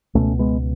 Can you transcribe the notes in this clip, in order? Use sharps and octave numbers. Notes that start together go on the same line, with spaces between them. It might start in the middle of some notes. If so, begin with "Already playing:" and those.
C#2 B2 A3 C#4
G#3 B3